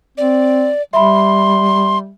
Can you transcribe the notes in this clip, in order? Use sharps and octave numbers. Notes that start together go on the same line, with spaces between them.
C4 D5
G3 E5 B5 C6